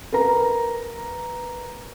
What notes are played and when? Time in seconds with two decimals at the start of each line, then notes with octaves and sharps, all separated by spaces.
0.12 A#4 B4 A#5